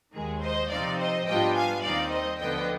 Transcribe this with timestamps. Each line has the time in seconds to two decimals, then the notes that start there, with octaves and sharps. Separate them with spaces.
0.14 D#2 D#3 G#3 G#4
0.42 C5 D#5
0.70 C3 F3 C4 D#4 D5 F5
0.98 C5 D#5
1.26 G#2 G3 B3 D4 F4 D#5 G5
1.54 F5 G#5
1.82 D#2 D#3 G3 C4 D#4 D5 F5
2.10 C5 D#5
2.38 D2 D3 F3 B3 D#5 G5